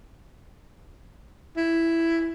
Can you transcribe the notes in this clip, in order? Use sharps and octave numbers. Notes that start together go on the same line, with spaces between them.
E4